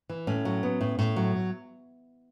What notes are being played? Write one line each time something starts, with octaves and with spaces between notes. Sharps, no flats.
E3
A2 C#4
F#3
B3
A2
A2
F#3